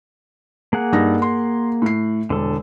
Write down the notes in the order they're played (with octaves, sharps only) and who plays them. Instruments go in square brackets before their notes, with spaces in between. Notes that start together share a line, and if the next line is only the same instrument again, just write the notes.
[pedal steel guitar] A#3 G#4 F#5
[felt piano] G2 D#4 A#6
C6
A2 C7
[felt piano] E1 [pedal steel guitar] D3 A4